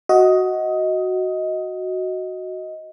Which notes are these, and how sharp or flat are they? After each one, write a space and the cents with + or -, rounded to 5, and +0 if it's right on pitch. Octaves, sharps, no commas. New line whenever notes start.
F#4 +0 D#5 +15